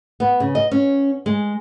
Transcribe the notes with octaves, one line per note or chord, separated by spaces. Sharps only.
B3
C#3
D#5
C#4
G#3